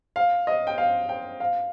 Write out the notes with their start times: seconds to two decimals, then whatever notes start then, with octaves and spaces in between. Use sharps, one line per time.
0.16 F5
0.47 D#5
0.67 G5
0.78 F5
1.09 G5
1.40 F5